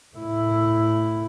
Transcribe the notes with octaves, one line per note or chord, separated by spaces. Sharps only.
A2 E4